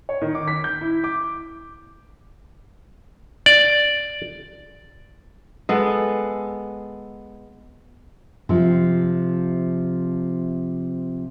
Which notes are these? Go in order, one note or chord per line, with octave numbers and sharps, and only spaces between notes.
C#5
D#3
D6
B6
G6
E4
D6
D5
G#3 B3 A4
C3 F3